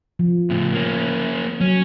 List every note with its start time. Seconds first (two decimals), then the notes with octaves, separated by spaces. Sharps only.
0.19 F3
0.50 A2 C#3
0.74 A#3 C#4
1.60 F#3 C#4